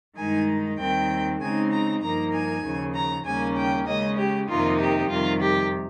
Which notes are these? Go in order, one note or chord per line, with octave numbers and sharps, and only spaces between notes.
G2 D#3 G#3 D#4 G#5
D#2 D#3 G3 C4 G5
C#3 G#3 C4 D#4 G#5
A#5
G2 F3 A#3 D#4 A#5
G#5
D#2 C#3 F3
A#5
D#2 C#3 G3 A#3 C#4 G#5
G5
C#3 G#3 C#4 D#5
G4
F2 C3 D#3 A#3 D#4 F4
G4
F2 C3 D#3 G3 F4
G4